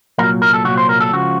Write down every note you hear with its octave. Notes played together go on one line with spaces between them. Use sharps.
C2 A#2 F#3 A#4
A#4
A4
C2 A#2 F#3 F#4
C5
A#4
A4
C#2 C#3 F3 F#4